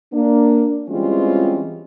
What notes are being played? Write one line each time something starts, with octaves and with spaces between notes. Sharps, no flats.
A#3 D4
E3 G3 G#3 C4 C#4 F4